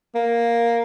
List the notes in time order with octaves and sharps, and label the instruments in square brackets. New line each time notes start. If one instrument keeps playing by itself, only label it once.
[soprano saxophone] A#3